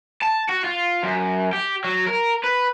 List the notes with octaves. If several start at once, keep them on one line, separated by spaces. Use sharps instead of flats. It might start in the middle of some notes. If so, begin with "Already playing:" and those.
A5
F#4
F4
F#2
G4
F#3
A#4
B4